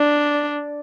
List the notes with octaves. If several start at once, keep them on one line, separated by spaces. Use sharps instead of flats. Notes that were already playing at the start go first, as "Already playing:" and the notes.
Already playing: D4